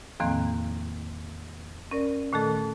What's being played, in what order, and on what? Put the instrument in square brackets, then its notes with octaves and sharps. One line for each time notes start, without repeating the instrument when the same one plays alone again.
[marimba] E2 A2 D#3 F3 A#3 C4
C#4 A#4 D5
A#2 D#3 A3 A4